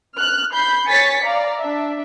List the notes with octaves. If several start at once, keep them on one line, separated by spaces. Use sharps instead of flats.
F6 F#6
B5 G6 C7
C#5 G#5 A6 B6 C#7
D5 F5 A#5
D4 E5